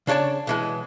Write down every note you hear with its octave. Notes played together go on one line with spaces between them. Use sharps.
C#3 D4 C#5 D5 A5
B2 E3 G#3